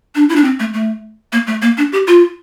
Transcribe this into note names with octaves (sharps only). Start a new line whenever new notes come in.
D4
E4
D4
C4
A3
A3
A#3
A3
A#3
D4
G4
F4